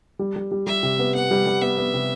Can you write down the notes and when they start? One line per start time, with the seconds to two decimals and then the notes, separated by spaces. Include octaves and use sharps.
0.19 G3
0.36 G3
0.51 G3
0.66 G3 E5
0.83 C3
0.99 B3
1.15 B3 F#5
1.31 G3
1.46 G3
1.61 B3 E5
1.78 B3
1.94 C3